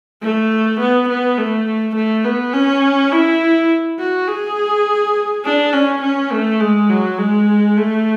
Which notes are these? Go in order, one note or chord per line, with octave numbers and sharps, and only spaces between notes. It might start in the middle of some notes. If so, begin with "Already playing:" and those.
A3
B3
B3
A3
A3
B3
C#4
E4
F#4
G#4
D4
C#4
C#4
A3
G#3
F#3
G#3
A3